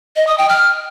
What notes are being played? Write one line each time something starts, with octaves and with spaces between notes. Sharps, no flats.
D#5
D#6
G5
F6